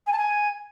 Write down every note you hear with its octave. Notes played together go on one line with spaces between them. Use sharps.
G#5
A5
G#5